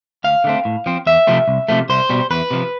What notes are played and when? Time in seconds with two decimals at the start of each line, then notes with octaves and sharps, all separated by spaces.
0.24 D2 F5
0.44 D3 A3 C4
0.65 A2
0.86 F3 C4
1.06 E2 E5
1.27 C3 F3 A3 C4
1.48 C2
1.68 C3 F3 A3
1.89 C2 C5
2.09 B2 G3
2.30 E2 B4
2.51 C3 F3